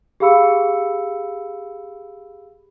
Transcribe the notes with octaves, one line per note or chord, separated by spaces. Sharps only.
G4 G#4 F5 B5 E6 C#7